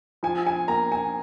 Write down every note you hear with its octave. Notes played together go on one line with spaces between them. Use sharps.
F3 G#5
G#5
A#3 A#5
G#5